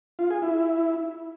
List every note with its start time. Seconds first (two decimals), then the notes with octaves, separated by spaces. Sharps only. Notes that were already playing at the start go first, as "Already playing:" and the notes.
0.19 F4
0.30 G#4
0.42 E4